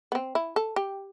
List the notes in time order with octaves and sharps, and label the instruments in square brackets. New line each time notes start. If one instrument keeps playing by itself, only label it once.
[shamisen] B3
C4
E4
A4
G4